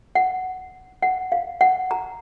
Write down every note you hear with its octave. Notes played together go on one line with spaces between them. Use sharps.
F#5
F#5
F5
F#5
A#5